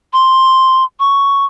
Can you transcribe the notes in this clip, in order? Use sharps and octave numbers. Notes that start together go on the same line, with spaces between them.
C6
C#6